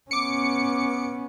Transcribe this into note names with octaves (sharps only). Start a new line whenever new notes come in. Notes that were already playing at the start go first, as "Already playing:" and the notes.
B3 C#4 D6 C#7